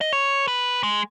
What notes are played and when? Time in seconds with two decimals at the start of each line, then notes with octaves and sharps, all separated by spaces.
0.01 D#5
0.12 C#5
0.48 B4
0.83 G#3